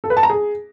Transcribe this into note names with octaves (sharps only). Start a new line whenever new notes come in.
A4
B4
A5
A#5
G#4